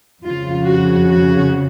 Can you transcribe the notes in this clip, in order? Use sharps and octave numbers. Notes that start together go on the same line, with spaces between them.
F2 C#3 F3 F4
F#4
F#4